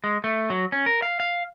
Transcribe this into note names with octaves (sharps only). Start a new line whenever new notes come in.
G#3
A3
F#3
C#4
A#4
F5
F5